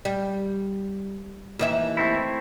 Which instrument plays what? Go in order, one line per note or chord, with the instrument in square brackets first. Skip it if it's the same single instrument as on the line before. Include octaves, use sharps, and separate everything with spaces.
[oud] G3
D#2 E3 E5
[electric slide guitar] A3 C4 E4